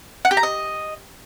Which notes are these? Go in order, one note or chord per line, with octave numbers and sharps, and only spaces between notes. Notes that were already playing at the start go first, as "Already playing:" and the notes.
F#5
G4
A#5
D#5